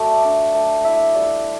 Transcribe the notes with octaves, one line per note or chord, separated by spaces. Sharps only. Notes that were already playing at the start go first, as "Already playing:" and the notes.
Already playing: F#3 A3 D5
D4
A3
E4 E5
G3 D5